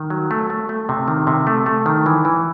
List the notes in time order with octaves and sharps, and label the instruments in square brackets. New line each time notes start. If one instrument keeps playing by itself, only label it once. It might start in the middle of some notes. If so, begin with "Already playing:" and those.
Already playing: [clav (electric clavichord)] D#3
F#3
A3
A3
A3
C3
D#3
C3
A3
A3
D#3
E3
E3